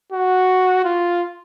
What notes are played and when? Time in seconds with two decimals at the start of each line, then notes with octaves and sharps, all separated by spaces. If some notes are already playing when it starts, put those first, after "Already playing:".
0.12 F#4
0.85 F4